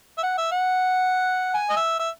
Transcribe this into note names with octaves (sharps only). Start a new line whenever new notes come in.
E5
F#5
E5
F#5
G#5
D#5
E5
E5